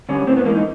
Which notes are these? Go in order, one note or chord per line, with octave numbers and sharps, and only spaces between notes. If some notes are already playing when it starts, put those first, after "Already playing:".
D3 G3 C#4
A2 C4
B3
E3 G#3 A#3
D#4